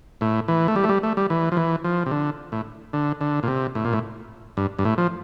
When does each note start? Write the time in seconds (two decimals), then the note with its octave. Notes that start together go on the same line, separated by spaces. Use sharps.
0.21 A2
0.48 E3
0.68 A3
0.76 G3
0.84 A3
0.89 G3
1.03 A3
1.17 G3
1.30 E3
1.52 F3
1.57 E3
1.84 F3
2.06 C3
2.11 D3
2.52 A2
2.93 D3
3.21 D3
3.43 A#2
3.48 C3
3.75 A2
3.85 A#2
3.93 A2
4.57 G2
4.79 G2
4.85 A2
4.98 F3